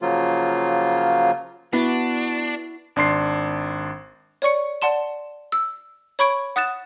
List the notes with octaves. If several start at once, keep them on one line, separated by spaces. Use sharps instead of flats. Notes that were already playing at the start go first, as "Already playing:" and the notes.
C#3 F3 F#3 A#3 F4
B3 D4 E4 F#4 B4
G#1 D4 C6 C7
C#5 D5 C#6 C#7
D5 F#5 A5 C6 E7
E6
C#5 B5 C#6 G#6 D7
F#5 D#6 F#6 A6 E7